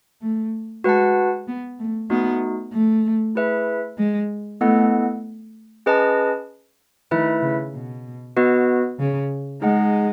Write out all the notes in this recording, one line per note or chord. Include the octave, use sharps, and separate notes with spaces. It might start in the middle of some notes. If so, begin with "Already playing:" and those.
A3
G#3 F#4 B4 F#5 A5
B3
A3
A3 B3 D#4 F#4
A3
E4 G#4 B4 E5
G#3
A3 B3 E4 A4 D#5 F#5
C#4 G#4 B4 D#5 A5
D#3 A3 E4 B4 E5
C#3
B2
B3 F#4 B4 D#5
C#3
G#3 D#4 G#4 D#5 F#5